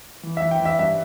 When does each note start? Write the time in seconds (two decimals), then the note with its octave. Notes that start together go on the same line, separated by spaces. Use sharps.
0.23 E3
0.37 E5
0.42 E3
0.51 G5
0.60 E3
0.65 E5
0.79 G2 E5